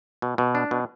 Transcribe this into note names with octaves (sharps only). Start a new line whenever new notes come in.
B2
B2
D4
B2